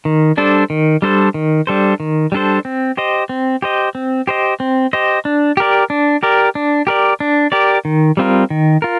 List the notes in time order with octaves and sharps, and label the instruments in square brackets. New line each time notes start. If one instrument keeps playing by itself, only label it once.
[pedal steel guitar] D#3
G3 D4 A4 C5
D#3
G3 D4 A4 C5
D#3
G3 D4 A4 C5
D#3
G3 D4 A4 C5
C4
G4 C5 D#5
C4
G4 C5 D#5
C4
G4 C5 D#5
C4
G4 C5 D#5
D4
G4 A#4 D5
D4
G4 A#4 D5
D4
G4 A#4 D5
D4
G4 A#4 D5
D#3
G3 C4 F4 A#4
D#3
F4 A#4